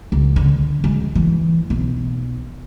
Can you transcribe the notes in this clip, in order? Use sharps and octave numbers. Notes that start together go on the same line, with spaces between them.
C#2
D3
G#3
E3
B1